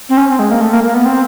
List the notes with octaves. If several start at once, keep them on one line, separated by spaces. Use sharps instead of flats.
C4
C#4
C4
G#3
A#3
A3
A#3
A#3
B3
C4